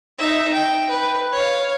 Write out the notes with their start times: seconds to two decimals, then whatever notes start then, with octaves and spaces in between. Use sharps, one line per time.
0.18 D#4 E5
0.53 G5
0.90 B4
1.32 C#5 F5